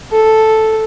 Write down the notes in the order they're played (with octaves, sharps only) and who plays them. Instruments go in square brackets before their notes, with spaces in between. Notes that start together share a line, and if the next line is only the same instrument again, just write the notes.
[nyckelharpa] A4